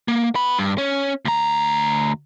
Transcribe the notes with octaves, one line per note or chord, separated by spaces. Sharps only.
A#3
B3 B5
G2
C#4
D2 A#5